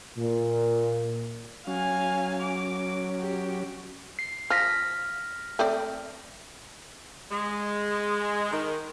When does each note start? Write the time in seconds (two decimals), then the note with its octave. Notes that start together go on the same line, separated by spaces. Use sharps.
0.17 A#2
1.67 F#3 C#4 F5 G#5
2.42 D6
3.21 G4
4.19 C7
4.50 F3 F6 A#6 B6
5.59 A3 C4 D5
7.32 G#3
8.52 D#3